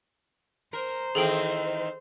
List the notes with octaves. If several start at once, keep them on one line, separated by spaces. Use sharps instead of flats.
A#4 C5
D#3 E3 C4 G#4 A4 G5